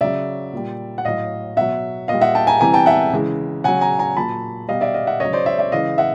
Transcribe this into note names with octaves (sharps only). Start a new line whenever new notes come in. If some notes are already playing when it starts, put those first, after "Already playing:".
C#3 F#3 D5 E5
A#2 G3
F#5
A2 F#3 D#5 F5
B2 F#3 E5 F#5
A#2 G3 D#5 F5
E5 F#5
G5 A5
G#5 A#5
C3 E3 G3 G#5 A#5
G5 A5
E5 F#5
C#3 E3 G#3
C#3 F#3 F#5 G#5
G#5 A#5
G#5 A#5
A#2 F#3 A5 B5
B2 G3 D#5 F5
D5 E5
D#5 F5
E5 F#5
C#3 F#3 C#5 D#5
C5 D5
D5 E5
D5 E5
C#3 E3 G#3 D#5 F5
E5 F#5